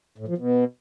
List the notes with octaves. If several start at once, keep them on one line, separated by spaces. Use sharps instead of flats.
A2
F3
B2